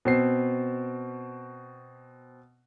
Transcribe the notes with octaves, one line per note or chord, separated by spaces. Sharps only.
B2 C4 C7